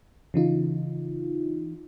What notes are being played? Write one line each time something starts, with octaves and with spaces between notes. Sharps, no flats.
C#3 E3 D#4 F4